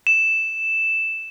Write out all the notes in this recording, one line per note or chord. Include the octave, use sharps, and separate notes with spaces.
E7